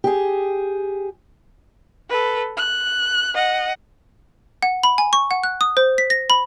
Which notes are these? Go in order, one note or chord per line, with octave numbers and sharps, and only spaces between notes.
G4 G#4
A4 B4
F#6
D#5 F#5
F#5
B5
G#5
C#6
F#5
F#6
D#6
C5
B6
A#6
B5